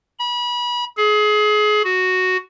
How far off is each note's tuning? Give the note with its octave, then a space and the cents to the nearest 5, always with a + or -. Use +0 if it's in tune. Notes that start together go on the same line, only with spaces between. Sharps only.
B5 -30
G#4 +30
F#4 +0